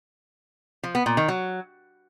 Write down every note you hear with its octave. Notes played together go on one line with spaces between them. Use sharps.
F3
B3
A#2
D#3
F#3